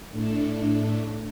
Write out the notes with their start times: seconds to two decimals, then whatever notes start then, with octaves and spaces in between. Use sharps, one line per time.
0.12 A2 A3 D4